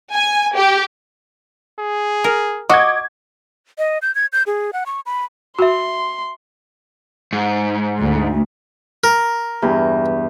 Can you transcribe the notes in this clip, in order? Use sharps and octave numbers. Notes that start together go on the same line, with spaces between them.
G#5
G4
G#4
A#4
F#4 D#5 D6 G#6
D#5
G6
G#6
G6
G#4
F#5
C#6
B5
F#4 E5 B5 C6
G#2
D2
A#4
E2 G2